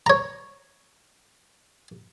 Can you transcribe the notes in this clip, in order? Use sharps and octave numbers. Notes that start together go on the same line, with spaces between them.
C#5 A#5